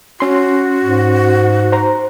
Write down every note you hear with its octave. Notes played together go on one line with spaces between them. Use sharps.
C#4 F#4 C6
G#2
C5 A#5